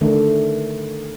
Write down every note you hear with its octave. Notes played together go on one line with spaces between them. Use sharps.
D3 D#3 A3 D4